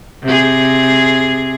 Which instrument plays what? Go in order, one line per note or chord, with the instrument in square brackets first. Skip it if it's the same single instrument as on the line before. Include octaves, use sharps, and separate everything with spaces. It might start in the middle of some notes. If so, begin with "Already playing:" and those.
[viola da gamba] C3 G#4